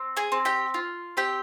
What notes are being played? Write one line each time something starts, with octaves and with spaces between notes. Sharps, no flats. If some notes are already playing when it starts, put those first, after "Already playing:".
Already playing: C4
G#4 G#5
C4
G4 G5
F4
C4 G4 G5